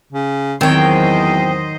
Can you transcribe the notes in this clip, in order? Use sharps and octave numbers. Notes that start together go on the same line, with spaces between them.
C#3
E2 D#3 F#3 C4 C5 C#5 D#5 G5